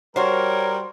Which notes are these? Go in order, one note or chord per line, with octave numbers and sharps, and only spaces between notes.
G3 F#4 A#4 C5 C#5